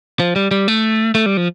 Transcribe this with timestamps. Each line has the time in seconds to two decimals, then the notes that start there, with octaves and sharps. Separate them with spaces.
0.20 F3
0.36 G3
0.51 G3
0.68 A3
1.15 A3
1.26 G3
1.37 F3